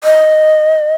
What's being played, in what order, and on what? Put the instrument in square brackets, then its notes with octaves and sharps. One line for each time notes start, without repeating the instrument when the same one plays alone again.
[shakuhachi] D#5